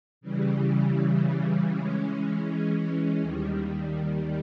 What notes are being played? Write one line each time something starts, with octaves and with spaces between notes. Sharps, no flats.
C#3 E3 G3
E3 G#3 C#4
D#2 D#3 G3